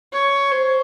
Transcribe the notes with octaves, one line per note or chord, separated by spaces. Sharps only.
C#5
C5